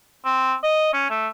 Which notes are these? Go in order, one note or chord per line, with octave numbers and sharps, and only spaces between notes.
C4
D#5
C#4
A3